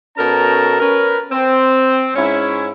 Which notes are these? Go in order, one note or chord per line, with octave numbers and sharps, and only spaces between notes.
B2 C#4 A4 A#4 A5 A#5
C#4 A#4 B4
C4
G#2 C#4 E4